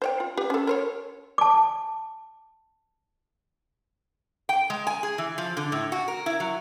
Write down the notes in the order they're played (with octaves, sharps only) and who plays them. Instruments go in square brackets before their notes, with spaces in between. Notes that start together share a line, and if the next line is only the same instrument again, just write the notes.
[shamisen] C5 C#5 G5
F4
G4 B4
C#4 A4
A#4 C5 C#5
[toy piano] A5 D6
[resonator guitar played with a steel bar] G5
G#3
G#5
G#4
E3
F3
D3
A2
F#4
A#4
E4
F#3